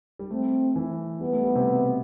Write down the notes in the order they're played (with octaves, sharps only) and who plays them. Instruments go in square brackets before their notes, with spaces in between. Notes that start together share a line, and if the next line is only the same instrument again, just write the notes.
[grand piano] G3
[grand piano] A3 [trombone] C4
[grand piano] E3
[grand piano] G3 [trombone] B3
[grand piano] A3
G3
C3
B2